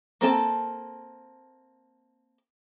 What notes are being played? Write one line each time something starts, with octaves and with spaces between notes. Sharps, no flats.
A#3 C4 A4 A5